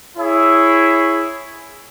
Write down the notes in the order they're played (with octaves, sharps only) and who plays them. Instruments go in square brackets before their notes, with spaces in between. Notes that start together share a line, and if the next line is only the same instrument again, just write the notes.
[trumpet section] E4 G#4 C#5 E5